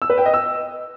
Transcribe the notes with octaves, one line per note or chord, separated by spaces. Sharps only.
E6
B4
G5
D#5
E6